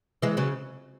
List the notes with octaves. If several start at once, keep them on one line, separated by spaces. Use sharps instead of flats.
E3 G#3
C#3 F#3